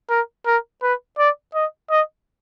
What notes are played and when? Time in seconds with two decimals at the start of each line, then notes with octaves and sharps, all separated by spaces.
0.10 A#4
0.46 A#4
0.82 B4
1.18 D5
1.54 D#5
1.90 D#5